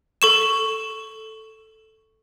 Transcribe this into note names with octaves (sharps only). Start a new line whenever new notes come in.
A4 C#6 E7